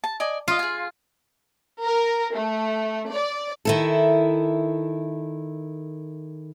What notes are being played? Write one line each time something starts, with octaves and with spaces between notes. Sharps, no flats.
A5
D5 D#5 G#5
F4 D#5 F5
G#4 G#5
A#4
A3
D5
D#3 E4 A4